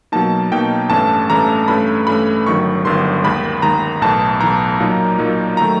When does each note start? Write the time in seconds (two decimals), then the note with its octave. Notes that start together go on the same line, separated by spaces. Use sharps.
0.12 B2 F#3 A#3 D#4 A5
0.52 B2 F#3 A#3 D#4 G5
0.90 A1 G2 E3 A3 C#4 A5
1.30 A1 G2 E3 A3 C#4 A#5
1.68 G2 E3 A3 C#4 B5
2.07 G2 E3 A3 C#4 B5
2.47 G1 G2 D#3 F#3 C#6
2.85 G1 G2 D#3 F#3 C6
3.24 D#2 D#3 G#3 B5
3.62 D#2 D#3 G#3 A#5
4.02 B1 A2 E3 A5
4.40 B1 A2 E3 A#5
4.80 A#2 F#3 A#3 D#4
5.19 A#2 F#3 A#3 D#4
5.57 D#3 F#3 A3 A#5